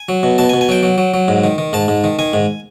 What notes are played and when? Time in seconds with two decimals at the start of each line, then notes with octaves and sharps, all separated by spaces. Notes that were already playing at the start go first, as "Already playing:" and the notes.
Already playing: G#5
0.09 F#3
0.23 B2
0.38 B2 A5
0.49 G#5
0.53 B2
0.61 G#5
0.69 F#3 G5
0.83 F#3
0.98 F#3
1.14 F#3
1.28 G#2
1.44 D#3
1.58 D#3
1.73 G#2 A5
1.88 G#2
2.04 D#3
2.19 D#3 G#5
2.33 G#2